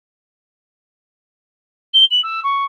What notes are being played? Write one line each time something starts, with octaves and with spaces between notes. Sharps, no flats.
G7
F#7
E6
C#6